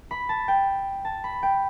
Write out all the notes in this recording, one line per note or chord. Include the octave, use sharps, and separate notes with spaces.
B5
A5
G5
A5
B5
G5